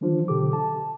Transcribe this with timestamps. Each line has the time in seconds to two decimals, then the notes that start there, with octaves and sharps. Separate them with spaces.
0.01 D#3 E3 F#3 D4 F4 C5
0.28 B2 D3 G4 A4 D6
0.53 A5